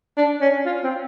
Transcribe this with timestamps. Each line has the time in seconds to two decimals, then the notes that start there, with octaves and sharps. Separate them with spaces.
0.17 D4
0.41 C#4
0.66 F4
0.84 C4